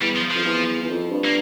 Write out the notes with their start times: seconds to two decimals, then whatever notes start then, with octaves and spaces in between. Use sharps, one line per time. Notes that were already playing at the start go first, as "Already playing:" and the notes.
0.01 E2 G3
0.16 F3
0.31 F2 F3
0.45 E2
0.82 E2
0.89 F2
1.11 G2
1.25 A#3